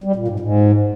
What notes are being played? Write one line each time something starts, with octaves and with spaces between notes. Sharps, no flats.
G3
A#2
G#2
G#2